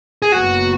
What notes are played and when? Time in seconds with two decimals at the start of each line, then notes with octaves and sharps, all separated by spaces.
0.22 G#4
0.32 F#1 F#2 F#3 B3 F#4